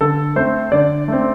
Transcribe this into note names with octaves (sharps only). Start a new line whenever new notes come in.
D3 A4
A3 C4 C5
D3 D5
A3 C4